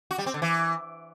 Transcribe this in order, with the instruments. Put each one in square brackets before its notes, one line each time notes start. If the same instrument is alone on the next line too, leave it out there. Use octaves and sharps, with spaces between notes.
[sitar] F#4
G3
C4
D3
E3